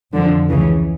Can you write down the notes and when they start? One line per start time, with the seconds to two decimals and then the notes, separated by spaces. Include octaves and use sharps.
0.13 F2 D3 F3
0.49 C#2 C#3 E3